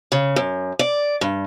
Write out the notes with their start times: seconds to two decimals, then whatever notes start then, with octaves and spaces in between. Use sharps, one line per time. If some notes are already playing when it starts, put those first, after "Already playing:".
0.12 C#3
0.36 F#2
0.79 D5
1.21 G2